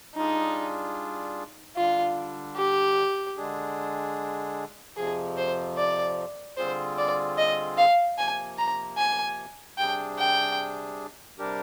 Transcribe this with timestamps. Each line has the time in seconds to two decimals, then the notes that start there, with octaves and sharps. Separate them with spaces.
0.15 G3 D4 D#4 F4 G#4
1.76 D3 G3 D4 F4
2.56 G4
3.36 D3 G#3 D4 G#4
4.96 F2 C3 F3 G#4
5.37 C5
5.77 D5
6.57 D3 G3 C4 F4 G#4 C5
6.98 D5
7.38 D#5
7.77 F5
8.17 C3 F3 A#3 G#5
8.58 A#5
8.98 G#5
9.77 C3 G3 D4 G#4 G5
10.19 G5
11.39 C3 G3 D4 G4 A#4